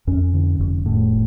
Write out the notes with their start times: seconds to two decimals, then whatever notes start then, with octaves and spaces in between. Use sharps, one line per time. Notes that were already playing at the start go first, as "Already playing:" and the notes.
0.07 F2 C#4
0.34 D3
0.59 F1
0.86 A2